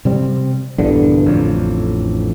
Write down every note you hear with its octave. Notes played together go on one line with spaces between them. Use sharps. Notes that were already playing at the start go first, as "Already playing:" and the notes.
C3 G3 C4
A#1 E2 G2 D3
A1 F2